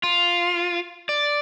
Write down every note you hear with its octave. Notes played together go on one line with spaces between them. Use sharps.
F4
D5